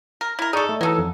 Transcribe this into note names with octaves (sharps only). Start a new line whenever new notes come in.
A#4
E4 A#4
D#4 G#4 A4 D5 C#6
A3
E3 F#3 D#4 A4
F2